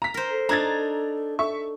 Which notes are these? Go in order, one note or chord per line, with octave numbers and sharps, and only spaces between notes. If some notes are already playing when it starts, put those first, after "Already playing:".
A#5 B6
A#4 C5
A4
D4 D#4 A#5 G#6 A6
A4 E5 C#6